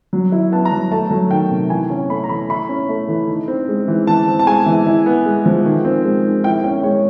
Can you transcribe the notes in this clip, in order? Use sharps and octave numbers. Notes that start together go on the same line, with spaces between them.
F#3
E4
B3 A5
A#5
F#3
A3 A5
F#3
D#3 G5
C3
E3 G#5
C#4 G#5
A3 B5
A#5
E3 B5
E4 B5
C#4
A3
E3
D#4
C4
G#3
E3
E3 A5
C4
A5
G#3 G#5
E3
E4
B3
G#3
F3
D#3
C4
G#3
D#3
E4 G5
C#4 G5
G#3 C#5